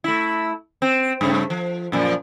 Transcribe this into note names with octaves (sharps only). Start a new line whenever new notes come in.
A3 E4
C4
G2 C#3 A3
F3
F#2 A#2 F3